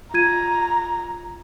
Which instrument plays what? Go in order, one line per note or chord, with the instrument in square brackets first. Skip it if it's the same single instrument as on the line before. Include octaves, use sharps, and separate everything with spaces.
[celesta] F4 G#6 D#7 [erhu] A#5